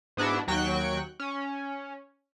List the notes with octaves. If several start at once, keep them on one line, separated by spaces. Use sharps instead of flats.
G#2 B3 D4 E4 F#4
D#2 F#3 F#4 G5 C#6 F#6
C#4